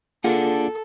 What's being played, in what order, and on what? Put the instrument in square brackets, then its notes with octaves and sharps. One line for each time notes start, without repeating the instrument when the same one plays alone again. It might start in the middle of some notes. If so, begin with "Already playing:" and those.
[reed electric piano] A#3 F4 G#4 [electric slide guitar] D4 F#5 [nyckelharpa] A4